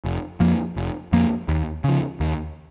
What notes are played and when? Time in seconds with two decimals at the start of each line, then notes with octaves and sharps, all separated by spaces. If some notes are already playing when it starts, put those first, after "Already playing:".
0.05 F1
0.40 F2 F3 A#3
0.76 F1
1.12 F2 F3 A#3
1.48 D#2
1.84 C#3 F3
2.20 D#2